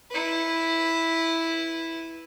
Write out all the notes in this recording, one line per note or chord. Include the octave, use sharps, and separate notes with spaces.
E4 B4